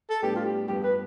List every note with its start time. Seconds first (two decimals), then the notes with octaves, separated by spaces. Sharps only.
0.10 A4
0.22 A2 G3 B3 D4 G4 A4
0.36 F4
0.45 G4
0.68 G2 F3 B3 G4
0.84 B4